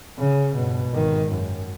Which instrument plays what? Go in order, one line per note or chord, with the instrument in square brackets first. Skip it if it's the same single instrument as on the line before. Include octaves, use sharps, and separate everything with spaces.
[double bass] C#3
G2 B2
G#1 D#3
F#2